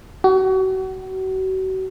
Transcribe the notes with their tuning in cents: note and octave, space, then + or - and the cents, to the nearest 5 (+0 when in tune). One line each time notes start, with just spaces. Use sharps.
F#4 +35